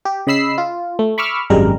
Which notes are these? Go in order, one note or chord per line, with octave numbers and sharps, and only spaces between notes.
G4
C#3 D#5 B5 E6 C7
F4
A3
B5 C#6 D6 E6 F6
G#1 F#2 G3 G#3 A#4